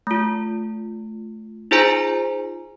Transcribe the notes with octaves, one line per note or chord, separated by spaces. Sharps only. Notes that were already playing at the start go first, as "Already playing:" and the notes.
A3 F4
D#4 F4 G#4 C5 G#5 A#5